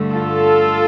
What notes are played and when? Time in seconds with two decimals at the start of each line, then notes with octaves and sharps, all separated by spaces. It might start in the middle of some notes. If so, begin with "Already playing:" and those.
Already playing: G2 D3 A3
0.11 F4 A4